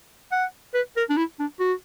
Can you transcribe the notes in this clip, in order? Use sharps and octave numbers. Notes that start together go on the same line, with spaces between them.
F#5
B4
A#4
D4
E4
D4
F#4